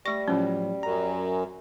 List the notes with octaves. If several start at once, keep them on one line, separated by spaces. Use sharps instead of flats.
G3 A3 C#6 A#6
A2 F3 F#3 C#4
F#2 A#5